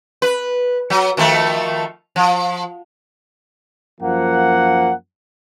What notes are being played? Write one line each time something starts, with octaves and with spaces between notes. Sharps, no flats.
B4
F#3
D#3 F3 A3
F3
F#2 F3 A#3 F#5